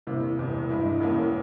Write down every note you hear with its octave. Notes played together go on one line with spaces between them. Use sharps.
E2 C3 E3 G3 A#3
E1 E2 C3
G2 E3 G#3 E4
E1 E2 E3 A#3 C#4